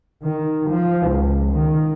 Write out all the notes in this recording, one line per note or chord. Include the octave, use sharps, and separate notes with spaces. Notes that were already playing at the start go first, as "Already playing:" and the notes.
D#3
F3
C#2
D#3